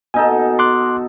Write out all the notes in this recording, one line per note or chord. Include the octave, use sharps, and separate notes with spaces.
B2 D#4 A4 G#5
C6 D6 F#6